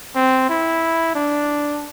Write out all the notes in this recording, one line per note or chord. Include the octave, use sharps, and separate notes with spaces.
C4
E4
D4